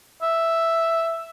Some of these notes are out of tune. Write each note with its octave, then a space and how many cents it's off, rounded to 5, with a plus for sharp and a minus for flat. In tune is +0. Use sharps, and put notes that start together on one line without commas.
E5 +0